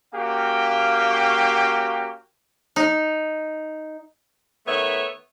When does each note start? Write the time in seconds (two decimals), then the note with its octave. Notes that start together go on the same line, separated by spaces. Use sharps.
0.15 A#3 C#4 F#4 G4 F5 G5
2.76 D#4
4.67 D#3 A3 B3 C#5 E5